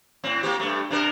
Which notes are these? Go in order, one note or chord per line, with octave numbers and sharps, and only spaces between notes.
A2 C4
A#3 C4 G4
G2 A3
C3 D4 A#4